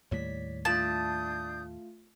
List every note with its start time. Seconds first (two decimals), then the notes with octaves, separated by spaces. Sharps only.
0.11 D#2 A2 G3 C#5 D5 B6
0.65 A3 D4 F4 F5 A5 D#6 G6